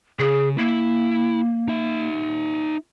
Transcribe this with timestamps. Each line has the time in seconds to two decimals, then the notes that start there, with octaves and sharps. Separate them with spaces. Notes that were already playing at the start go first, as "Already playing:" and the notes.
0.19 C#3 G#4
0.58 A#3 E4
1.68 D#4 E5